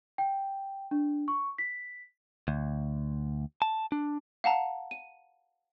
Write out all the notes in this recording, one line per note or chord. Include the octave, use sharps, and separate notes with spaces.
G5
D4
C#6
B6
D2
A5
D4
F5 F#5 A5 A#5
D#7